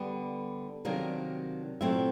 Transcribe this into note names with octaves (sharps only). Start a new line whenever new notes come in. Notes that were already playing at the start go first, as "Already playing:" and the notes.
Already playing: D3 G3 B3
C3 D#3 F#3 A#3 D4 A#4
A#2 F#3 A3 C4 E4 E5